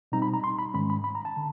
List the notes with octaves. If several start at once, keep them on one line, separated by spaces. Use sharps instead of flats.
B2 G3 C4 D#4 A#5
B5
A#5
C6
B5
G#2 D#3 G#3 C#4 B5
B5
B5
A#5
A5
D3